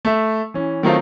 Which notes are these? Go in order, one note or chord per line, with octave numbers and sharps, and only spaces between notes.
A3 E5
E3 C#4
D#3 F#3 A3 C4 D#4 F4